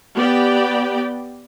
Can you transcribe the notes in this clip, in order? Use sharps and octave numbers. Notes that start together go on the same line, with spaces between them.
B3 G4 D5 G5